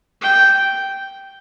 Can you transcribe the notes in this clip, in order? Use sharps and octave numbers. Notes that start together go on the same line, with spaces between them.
G5